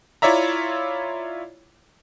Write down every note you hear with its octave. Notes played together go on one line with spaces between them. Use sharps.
E4 F4 C#5 D5 E5 A#5